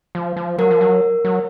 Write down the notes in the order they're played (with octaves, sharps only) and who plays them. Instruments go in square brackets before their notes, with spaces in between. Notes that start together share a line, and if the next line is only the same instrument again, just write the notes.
[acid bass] F3
F3
[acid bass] F#3 [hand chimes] A#4
[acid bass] F3
F#3
F#3